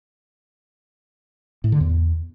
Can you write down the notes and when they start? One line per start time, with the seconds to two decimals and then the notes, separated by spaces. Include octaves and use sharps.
1.64 A2
1.72 D3
1.81 E2